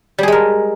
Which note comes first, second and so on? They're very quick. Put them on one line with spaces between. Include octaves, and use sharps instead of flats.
G3 G#4 G#3 A#4